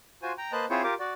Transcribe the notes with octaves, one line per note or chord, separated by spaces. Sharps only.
F4 F#4 C5 G#5
G5 A#5
A#3 B4 C5 D#5 A5 F#6
C4 E4 F4 G#4 C5 C#5
F4 G4 A#4 D6
F#4 D5